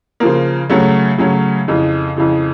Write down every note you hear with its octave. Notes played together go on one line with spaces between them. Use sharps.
C#3 F3 A#3
C#3 F#3 A3 C#4
C#3 F#3 A3 C#4
F2 C#3 E3
F2 C#3 E3